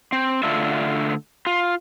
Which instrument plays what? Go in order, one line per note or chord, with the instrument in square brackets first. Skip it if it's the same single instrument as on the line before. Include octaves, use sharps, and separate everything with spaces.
[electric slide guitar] C4
D3 A3 F4 E5
F4